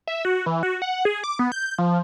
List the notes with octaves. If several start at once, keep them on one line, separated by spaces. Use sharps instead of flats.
E5
F#4
E3
F#4
F#5
G#4
D6
B3
G6
F3